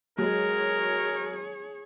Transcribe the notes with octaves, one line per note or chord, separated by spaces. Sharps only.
F#3 G#3 G#4 A#4 C#5